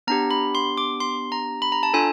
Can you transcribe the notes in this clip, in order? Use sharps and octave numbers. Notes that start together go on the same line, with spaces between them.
B3 D4 G4 A#5
B5
C6
D6
C6
A#5
B5
A#5
A5
D4 F4 A4 G#5